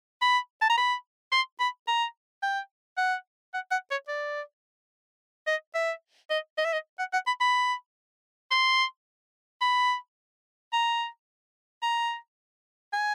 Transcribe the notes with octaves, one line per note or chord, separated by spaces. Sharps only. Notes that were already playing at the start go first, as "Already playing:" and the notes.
B5
A5
A#5
B5
C6
B5
A#5
G5
F#5
F#5
F#5
C#5
D5
D#5
E5
D#5
D#5
E5
D#5
F#5
F#5
B5
B5
C6
B5
A#5
A#5
G#5